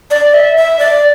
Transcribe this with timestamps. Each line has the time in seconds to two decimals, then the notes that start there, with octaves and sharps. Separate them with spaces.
0.11 D5
0.34 E5
0.57 E5
0.79 D5